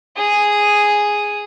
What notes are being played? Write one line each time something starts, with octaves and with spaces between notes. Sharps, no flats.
G#4 D#6